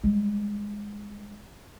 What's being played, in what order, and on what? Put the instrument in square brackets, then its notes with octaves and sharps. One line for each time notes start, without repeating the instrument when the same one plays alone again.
[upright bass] G3 G#3